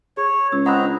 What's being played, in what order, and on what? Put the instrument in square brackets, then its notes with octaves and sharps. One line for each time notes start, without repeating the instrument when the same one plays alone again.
[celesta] G#4 [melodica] C#5
[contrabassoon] C#2 [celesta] E6
[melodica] C4 D#5 A#5 [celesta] F#5 B5 F#6
[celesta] D4